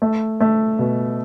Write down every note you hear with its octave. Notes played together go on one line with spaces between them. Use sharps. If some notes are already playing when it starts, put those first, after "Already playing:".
A3
A3
B2